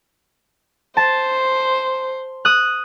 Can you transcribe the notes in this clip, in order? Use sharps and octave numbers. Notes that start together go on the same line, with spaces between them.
C5 A5
D#6 F#6